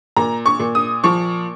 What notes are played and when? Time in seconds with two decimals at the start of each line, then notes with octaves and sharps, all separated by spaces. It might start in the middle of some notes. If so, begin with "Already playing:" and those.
0.16 A#2 A#5
0.46 C#6
0.60 A#2
0.75 D#6
1.04 F3 C#6